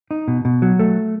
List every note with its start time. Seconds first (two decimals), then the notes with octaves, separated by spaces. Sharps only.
0.11 D#4
0.28 B2
0.45 B2
0.62 F#3
0.79 A3